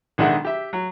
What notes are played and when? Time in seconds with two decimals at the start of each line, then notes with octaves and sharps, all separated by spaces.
0.18 B1 D#3 G#3 D4 E5 F#5
0.45 G4 E5
0.73 F#3